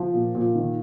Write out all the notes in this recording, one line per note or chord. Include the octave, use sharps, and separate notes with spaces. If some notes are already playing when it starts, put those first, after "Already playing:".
Already playing: F3
A#2
A#2
D#3